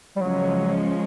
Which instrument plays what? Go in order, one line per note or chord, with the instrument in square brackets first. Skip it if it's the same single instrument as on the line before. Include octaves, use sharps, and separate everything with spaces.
[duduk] G3
[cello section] C#3 F3 G#3 C#4 [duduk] F#3